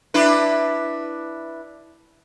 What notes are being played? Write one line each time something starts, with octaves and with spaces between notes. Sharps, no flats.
D4 E4 B4